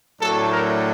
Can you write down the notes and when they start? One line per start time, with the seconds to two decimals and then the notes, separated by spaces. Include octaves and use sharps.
0.20 A2 F#3 A3 D4 A4
0.52 A#4